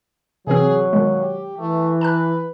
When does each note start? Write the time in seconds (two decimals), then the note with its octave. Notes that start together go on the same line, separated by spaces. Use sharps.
0.47 C3 E3 F#3 C4 G#4
0.93 D#2 B2 D#3 G#3
1.21 G4
1.58 E3 A3
2.01 B4 A5 A#5 F#6